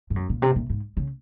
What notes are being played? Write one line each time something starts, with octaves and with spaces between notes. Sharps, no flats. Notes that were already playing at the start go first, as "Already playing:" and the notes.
G#2
F#2
A#2
C3
A#2
G#2
C#3